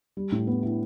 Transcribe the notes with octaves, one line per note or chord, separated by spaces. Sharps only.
G3
A2
B3
E4